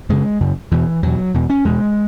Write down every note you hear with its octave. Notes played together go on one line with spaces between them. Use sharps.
F#2 C#3 G#3
F#2 C#3
E2 B2 E3
E2 B2 F#3
E2 B2
C#4
E2 B2 G#3